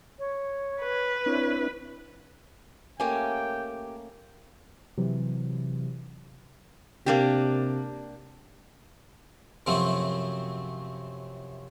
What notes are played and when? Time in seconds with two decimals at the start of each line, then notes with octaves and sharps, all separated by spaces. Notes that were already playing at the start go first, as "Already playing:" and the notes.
0.19 C#5
0.81 B4
1.26 C4 D4 E4 C#5
3.00 A3 A#3 C#4 G4 G5 G#5
4.98 C3 E3 F#3
7.06 C3 A#3 D4 G4
9.66 F#2 C3 F3 F#3 A3 C4